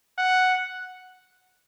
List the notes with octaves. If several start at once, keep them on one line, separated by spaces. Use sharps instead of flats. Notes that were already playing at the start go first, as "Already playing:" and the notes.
F#5